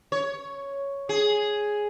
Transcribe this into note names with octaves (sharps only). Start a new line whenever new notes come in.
C#5
G#4